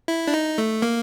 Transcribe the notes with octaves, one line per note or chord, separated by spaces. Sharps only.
E4
D4
D#4
A3
A#3